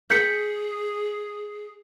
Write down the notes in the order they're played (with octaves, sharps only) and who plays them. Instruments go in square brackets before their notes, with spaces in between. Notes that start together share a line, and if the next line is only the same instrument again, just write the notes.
[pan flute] G#4 [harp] G6 B6 C#7